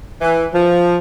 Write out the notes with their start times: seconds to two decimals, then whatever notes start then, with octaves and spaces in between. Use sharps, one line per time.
0.22 E3
0.53 F3